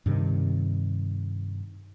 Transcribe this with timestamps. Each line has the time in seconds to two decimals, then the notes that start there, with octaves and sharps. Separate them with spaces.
0.06 G2 C3 D#3